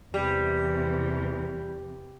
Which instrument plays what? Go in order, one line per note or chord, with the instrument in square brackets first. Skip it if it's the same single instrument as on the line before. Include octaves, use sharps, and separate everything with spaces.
[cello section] E2 C3 E3 [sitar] G3